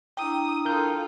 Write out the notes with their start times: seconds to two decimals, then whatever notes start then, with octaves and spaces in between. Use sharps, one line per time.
0.17 D4 E4 G5 A#5 D#6
0.65 F4 A4 A#4 G6